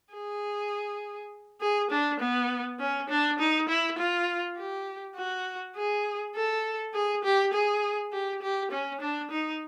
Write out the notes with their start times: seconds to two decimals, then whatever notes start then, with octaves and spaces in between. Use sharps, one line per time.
0.14 G#4
1.61 G#4
1.91 D4
2.20 B3
2.79 C#4
3.09 D4
3.39 D#4
3.69 E4
3.98 F4
4.57 G4
5.16 F#4
5.76 G#4
6.35 A4
6.94 G#4
7.24 G4
7.53 G#4
8.12 G4
8.42 G4
8.71 C#4
9.01 D4
9.31 D#4